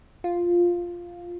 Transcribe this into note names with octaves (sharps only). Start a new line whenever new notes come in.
F4